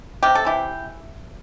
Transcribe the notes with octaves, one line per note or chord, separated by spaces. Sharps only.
C3 G4
A4
E3 E4 G4